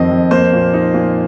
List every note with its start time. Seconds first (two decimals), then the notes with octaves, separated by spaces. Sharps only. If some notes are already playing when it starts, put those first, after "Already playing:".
Already playing: F2 D#3 C4 D#5
0.11 F2
0.31 A#3 C5
0.53 A#2
0.73 D#4
0.94 A#2